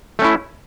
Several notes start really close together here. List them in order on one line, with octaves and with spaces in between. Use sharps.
A3 C#4 E4